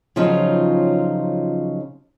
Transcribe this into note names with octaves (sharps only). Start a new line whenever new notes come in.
C#3 F3 F#3 C#4 D#4 F4